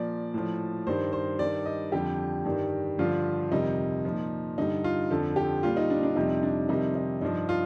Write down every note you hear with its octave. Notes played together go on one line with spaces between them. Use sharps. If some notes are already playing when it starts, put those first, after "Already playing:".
Already playing: A#2 F3 D5
A2 F3
G2 D#3 G3 C5
C5
G2 D#3 G3 D5
D#5
F2 D3 G3 G4
G2 D#3 G3
G2 D3 F3 F4
F2 C3 D#3 G3 D#4
A#2 F3
G2 D3 G3 D#4
F4
F2 D3 F3 A4
G4
A#2 G3 F4
D#4
D4
D4
F2 C3 G3 D#4
D4
F2 C3 D#3 G3 D#4
D#4
G2 F3 D#4
F4